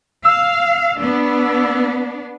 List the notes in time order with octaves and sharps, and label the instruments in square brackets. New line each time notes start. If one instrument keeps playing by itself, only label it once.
[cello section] F5 [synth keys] E6
[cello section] B3 D4